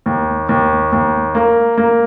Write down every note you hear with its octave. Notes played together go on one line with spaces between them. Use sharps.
D#2
D#2
D#2
A#3
A#3